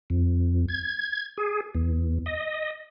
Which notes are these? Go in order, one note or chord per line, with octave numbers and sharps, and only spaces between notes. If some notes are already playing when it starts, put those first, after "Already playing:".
F2
G#6
G#4
E2
D#5